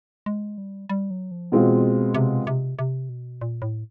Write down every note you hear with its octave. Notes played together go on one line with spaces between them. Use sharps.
G#3
G3
G3
F#3
F3
B2 E3 G#3 C4 F4
C3
C3
C3
B2
A#2
A2